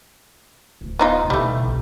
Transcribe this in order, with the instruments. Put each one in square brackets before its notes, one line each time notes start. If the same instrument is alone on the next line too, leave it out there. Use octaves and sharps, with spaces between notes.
[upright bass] D1 D#3
[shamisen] B3 D#4 F4
[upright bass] B2 E4 [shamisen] G3 A3
[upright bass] C2 A2